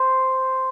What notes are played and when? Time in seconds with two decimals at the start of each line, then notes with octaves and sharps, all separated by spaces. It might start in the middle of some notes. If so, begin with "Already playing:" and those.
Already playing: C5